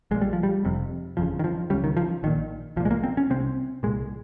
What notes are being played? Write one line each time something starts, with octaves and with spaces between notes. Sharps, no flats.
A#1 A#2 G#3
G3
F3
G3
F1 F2 C3
G1 F2 C#3 F3
D#3
F3
C#2 C#3 G3
D#3
F3
A#1 A#2 D#3
C2 A#2 F3
G#3
A#3
C4
C#4
C2 C3 C4
C2 A#2 G#3